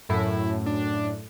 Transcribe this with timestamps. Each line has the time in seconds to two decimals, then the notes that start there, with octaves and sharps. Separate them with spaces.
0.09 F#2 A2 E4
0.66 D4